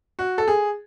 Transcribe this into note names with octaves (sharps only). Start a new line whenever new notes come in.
F#4
A4
G#4